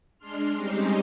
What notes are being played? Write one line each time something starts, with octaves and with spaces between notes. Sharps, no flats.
G#3 D4 C6 F6
G3 G#3 C4 C#4 D#4 G4